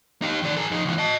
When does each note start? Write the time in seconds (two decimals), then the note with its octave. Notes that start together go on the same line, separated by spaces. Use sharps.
0.22 D#4 G4
0.43 D#3 D5
0.57 G#4 A#4
0.70 F2 D#4
0.85 C#2 E3
0.98 D#5 A5